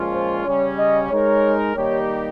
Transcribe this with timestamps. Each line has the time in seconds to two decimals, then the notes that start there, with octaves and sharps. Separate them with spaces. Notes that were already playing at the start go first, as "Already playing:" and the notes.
Already playing: A#2 F3 G#3 C#4 F4
0.14 C5
0.46 C#3 G3 C#4 C#5
0.79 D#5
1.11 G#3 D#4 A#4 C#5
1.75 D#3 G3 A#3 D#4 G4 C#5